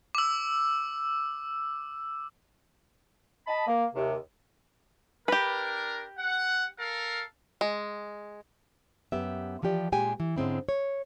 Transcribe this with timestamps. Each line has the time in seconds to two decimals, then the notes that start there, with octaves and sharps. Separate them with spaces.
0.15 D6 E6
3.47 D#5 A5 B5
3.67 A#3
3.95 D#2 C3
5.28 D4 G4 A#4 B4
6.19 F#5
6.79 A4 A#4 F5
7.61 G#3
9.12 F#2 B3 G4 E5
9.62 E3 F3 F4 G4 D5
9.92 A#2 G#3 G4 G5 G#5
10.20 E3
10.36 G#2 D3 G#3 C4 C#4 E4
10.69 C#5